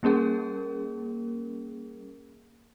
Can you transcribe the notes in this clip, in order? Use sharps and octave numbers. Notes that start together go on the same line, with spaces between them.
G3 A#3 C#4 G#4 A#4